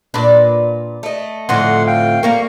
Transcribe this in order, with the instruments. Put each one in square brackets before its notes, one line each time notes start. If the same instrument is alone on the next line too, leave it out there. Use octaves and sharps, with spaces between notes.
[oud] A#2 D4 [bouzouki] B4 D5
[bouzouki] A3 D#5
[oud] F2 A2 D3 [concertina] F#5 C6
[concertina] F5 G5
[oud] G3 A#3 A#4 [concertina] F5 C#6